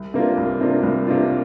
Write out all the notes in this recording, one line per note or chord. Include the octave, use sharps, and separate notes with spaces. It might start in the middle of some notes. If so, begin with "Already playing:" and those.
Already playing: C2
C3 A#3 D4 F4
C2
C3 A#3 D4 F4
C2
C3 A#3 D4 F4